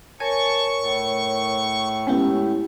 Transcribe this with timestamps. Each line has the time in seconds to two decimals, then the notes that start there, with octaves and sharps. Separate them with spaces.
0.20 A#4 C#5 G#5 A5 C#6
0.80 A2
2.07 G#3 B3 C#4 E4 G4